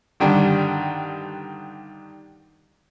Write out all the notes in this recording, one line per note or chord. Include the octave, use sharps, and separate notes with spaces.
G2 D3 D#3 G3 D4 G4